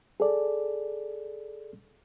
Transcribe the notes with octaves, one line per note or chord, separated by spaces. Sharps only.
G#4 A4 D5